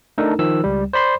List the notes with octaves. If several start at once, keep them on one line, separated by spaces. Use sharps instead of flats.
A3 D4 D#4 A4 A#4
D#3 F3 E6
C#2 G3
C5 D5 B5 C6